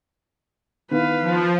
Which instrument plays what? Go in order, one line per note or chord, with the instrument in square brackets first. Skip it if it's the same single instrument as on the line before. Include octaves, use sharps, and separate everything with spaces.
[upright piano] D#3 B3 E4 [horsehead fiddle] B4 F5
[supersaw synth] F3